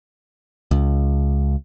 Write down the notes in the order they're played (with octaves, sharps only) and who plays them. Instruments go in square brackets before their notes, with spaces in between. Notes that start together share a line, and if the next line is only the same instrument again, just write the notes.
[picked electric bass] C#2